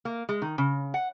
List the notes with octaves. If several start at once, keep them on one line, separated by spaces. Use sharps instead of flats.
A#3
G#3
D#3
C#3
F#5